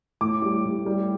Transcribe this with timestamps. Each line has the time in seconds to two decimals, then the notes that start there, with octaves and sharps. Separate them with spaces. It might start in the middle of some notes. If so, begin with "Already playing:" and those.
0.21 A2 D6
0.42 G3
0.65 A2
0.86 G3